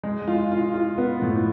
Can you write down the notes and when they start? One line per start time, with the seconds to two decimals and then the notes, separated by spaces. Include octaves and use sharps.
0.03 G#3
0.28 F4
0.52 F4
0.74 F4
0.98 B3
1.22 A2